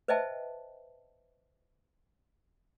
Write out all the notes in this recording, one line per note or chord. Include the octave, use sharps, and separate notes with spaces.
B4 C5 D#5 E5 G5 A5